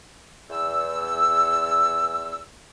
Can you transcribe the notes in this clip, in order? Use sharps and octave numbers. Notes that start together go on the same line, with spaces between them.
E2 E6